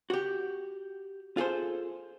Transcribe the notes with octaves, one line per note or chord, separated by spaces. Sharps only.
F#4 G4
F4 G#4 A4 C5